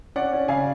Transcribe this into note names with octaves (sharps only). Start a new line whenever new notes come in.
C#4 D5 F#5
C#4
C#3 F5 G#5